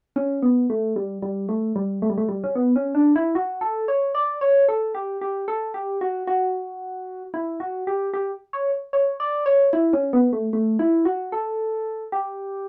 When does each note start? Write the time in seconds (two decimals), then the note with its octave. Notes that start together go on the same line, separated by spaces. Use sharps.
0.16 C#4
0.42 B3
0.70 A3
0.96 G3
1.22 G3
1.49 A3
1.76 G3
2.02 A3
2.10 G3
2.18 A3
2.29 G3
2.44 C#4
2.55 B3
2.76 C#4
2.95 D4
3.16 E4
3.35 F#4
3.61 A4
3.88 C#5
4.15 D5
4.41 C#5
4.68 A4
4.95 G4
5.21 G4
5.48 A4
5.74 G4
6.01 F#4
6.27 F#4
7.34 E4
7.60 F#4
7.87 G4
8.14 G4
8.53 C#5
8.93 C#5
9.20 D5
9.46 C#5
9.73 E4
9.93 C#4
10.13 B3
10.33 A3
10.53 A3
10.79 E4
11.05 F#4
11.32 A4
12.12 G4